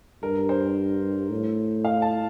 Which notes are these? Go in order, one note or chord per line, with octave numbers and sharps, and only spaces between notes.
G2 A#4
C5
A2
F5
A5